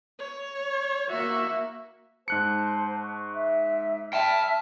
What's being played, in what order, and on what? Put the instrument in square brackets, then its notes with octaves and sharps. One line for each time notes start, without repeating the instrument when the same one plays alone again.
[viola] C#5
[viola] A#3 F#4 [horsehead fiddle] E5
[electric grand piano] G#2 F#6 C#7 [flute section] C5 A5
[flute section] C#6
E5
[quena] E5 [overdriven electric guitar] G5 A5 [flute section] F6